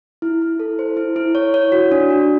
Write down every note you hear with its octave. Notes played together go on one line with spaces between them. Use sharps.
E4
E4
A4
C5
E4
E4
C#5
C#5
F#4
D4
F#4